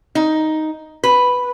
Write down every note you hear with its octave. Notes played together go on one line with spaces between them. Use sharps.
D#4
B4